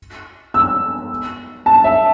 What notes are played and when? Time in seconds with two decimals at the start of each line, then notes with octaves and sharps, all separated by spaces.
0.54 E6
1.66 A5
1.84 E5